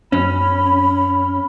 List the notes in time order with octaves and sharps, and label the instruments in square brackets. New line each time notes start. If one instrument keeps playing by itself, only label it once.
[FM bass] F#2 [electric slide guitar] C#4 [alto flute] B5